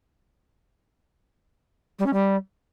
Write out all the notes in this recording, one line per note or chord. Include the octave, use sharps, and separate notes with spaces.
G3
C#4
G3